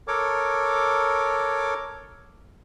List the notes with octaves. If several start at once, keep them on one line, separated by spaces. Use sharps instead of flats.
A4 A#4 C#5 D6